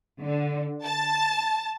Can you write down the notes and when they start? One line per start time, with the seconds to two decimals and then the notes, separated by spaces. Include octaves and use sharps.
0.22 D3
0.84 A5